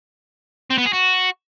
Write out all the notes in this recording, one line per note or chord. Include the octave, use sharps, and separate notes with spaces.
C4
B3
G#4
F#4